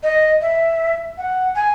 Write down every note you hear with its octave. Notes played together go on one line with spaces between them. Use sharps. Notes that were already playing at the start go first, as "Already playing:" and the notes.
D#5
E5
F#5
G#5